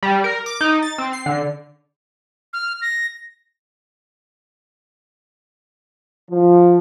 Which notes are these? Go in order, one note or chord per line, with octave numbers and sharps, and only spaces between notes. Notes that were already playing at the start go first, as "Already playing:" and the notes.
G3
A#4
D6
D#4
A6
C4
C7
D3
F6
A#6
F3